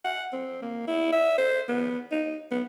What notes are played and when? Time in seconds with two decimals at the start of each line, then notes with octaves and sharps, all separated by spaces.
0.05 F#5
0.33 C4
0.62 A#3
0.88 E4
1.13 E5
1.38 C5
1.69 B3
2.12 D#4
2.51 B3